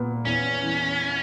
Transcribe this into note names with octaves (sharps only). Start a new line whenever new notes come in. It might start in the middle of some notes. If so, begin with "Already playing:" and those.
Already playing: A#2 B3
E2 C#4
E3